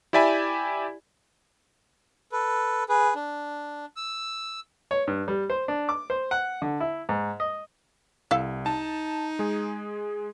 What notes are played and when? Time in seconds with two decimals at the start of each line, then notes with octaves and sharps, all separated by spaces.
0.13 E4 G4 D5 E5 G#5 B5
2.32 A4 B4
2.89 G#4 B4
3.15 D4
3.97 E6
4.91 C#5
5.07 G2
5.28 G3
5.50 C5
5.68 D4
5.89 D6
6.10 C5
6.31 F#5
6.62 D3
6.80 E4
7.09 G#2
7.40 D#5
8.31 C2 E4 A4 F5
8.66 D#4 A5
9.39 G#3 G#4